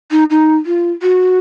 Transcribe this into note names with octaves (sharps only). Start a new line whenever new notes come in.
D#4
D#4
F4
F#4